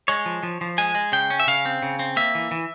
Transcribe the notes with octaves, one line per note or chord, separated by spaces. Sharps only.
G#3 C#5
F3
F3
F3
G#3 G#5
G#3
C#3 G5
C#4
E5
C#3 F5
C4
C#3
C4
A#3 E5
E3
E3